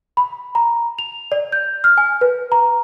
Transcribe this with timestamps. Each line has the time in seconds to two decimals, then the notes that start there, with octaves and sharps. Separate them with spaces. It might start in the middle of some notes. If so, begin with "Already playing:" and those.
0.17 B5
0.55 A#5
0.99 F7
1.32 D5
1.52 G6
1.84 F6
1.98 G#5
2.21 B4
2.52 A#5